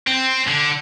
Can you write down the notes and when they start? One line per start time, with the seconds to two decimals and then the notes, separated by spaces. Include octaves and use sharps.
0.07 C4
0.48 D3